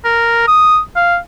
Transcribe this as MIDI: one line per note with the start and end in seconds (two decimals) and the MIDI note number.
0.05 0.45 70
0.47 0.79 87
0.96 1.17 77